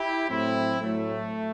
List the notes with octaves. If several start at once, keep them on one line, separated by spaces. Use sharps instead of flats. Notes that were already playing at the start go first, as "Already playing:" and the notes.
Already playing: E4 G4
A2 F#3 C4 E4
A2 F#3 A3